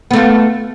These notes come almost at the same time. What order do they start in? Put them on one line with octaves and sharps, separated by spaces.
B3 A3 F4